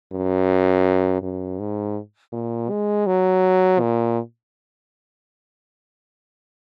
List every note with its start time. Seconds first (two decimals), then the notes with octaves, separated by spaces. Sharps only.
0.12 F#2
1.22 F#2
1.59 G#2
2.32 A#2
2.70 G#3
3.07 F#3
3.80 A#2